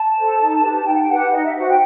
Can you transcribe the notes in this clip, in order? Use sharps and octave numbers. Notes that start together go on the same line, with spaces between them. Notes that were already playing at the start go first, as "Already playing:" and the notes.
Already playing: A5
A4 C5
D#4
G4 B4
D#4 G5
F#5
G5
G4 B4 F#5
D#4 D#5
E5
F#4 C5 F#5
G5